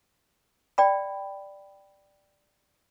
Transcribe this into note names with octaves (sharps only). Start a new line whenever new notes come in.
D5 G5 B5